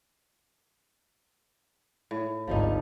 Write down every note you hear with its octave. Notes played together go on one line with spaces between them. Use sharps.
A2
G#1 D2 F3 G3 D#4